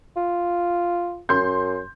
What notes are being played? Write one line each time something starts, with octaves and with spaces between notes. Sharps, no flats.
F4
F#2 C6 G6